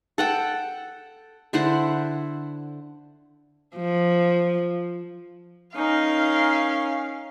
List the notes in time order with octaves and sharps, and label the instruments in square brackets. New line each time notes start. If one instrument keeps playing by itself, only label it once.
[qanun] A4 F#5 G5
D3 E4 C5 F#5
[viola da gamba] F3
[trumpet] C#4 [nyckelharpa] D#4 A#4 [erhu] F5